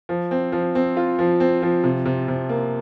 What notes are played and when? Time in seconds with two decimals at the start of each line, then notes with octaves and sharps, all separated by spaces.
0.09 F3
0.31 C4
0.52 F3
0.75 C4
0.97 F4
1.19 F3
1.40 C4
1.62 F3
1.84 C3
2.05 C3
2.28 C3
2.49 A#3